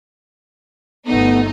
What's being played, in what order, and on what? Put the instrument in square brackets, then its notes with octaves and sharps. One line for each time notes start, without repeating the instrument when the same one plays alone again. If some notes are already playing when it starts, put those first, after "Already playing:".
[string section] G1 A3 D#4 [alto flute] B3